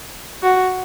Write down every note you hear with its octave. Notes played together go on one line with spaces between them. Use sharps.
F#4